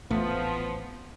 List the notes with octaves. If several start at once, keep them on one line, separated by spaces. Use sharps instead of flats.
A1 F2 G#2 F3 A3 B3